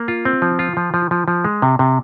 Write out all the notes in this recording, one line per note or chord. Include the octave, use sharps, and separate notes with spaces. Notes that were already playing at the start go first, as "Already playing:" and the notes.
Already playing: A#3
F4
C4
F3
F4
F3
F3
F3
F3
G#3
C3
C3